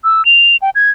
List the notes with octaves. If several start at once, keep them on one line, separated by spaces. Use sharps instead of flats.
E6
F7
G5
G#6